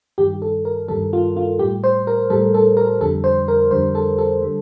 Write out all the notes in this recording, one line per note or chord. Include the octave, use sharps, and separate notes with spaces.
G2 D#3 G3 G4
A4
A#4
G2 D#3 G3 A4
F4
F4
A2 G3 G4
C5
A#4
A2 G3 A4
A4
A#4
F2 D3 G3 A4
C5
A#4
F2 D3 G3 C5
A4
A4
D3 G3